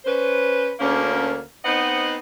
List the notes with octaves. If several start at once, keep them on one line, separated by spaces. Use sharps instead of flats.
C#4 B4 C5
D2 A#3 C#4
B3 C4 D#4 C5 D#5 F#5